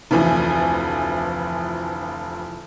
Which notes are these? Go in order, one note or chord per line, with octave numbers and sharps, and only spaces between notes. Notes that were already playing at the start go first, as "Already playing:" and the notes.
F1 D2 E3 F3 G#5